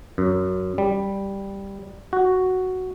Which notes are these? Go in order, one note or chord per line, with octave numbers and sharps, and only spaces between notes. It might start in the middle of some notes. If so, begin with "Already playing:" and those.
F#2
G3
F#4